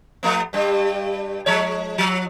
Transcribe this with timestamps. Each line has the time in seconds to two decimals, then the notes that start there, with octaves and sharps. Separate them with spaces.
0.23 F3 A3 B3
0.53 G2 G3
1.46 F3 G#3 C#5
1.98 F3